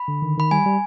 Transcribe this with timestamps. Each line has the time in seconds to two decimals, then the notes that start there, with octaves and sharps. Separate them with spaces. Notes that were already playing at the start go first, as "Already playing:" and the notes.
Already playing: B5
0.08 D3
0.22 D#3
0.37 D#3 B5
0.51 G3 G#5
0.66 G3